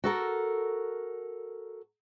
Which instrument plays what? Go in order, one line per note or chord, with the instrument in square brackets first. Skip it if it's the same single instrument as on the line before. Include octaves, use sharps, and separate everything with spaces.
[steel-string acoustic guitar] F#4 A4 A#4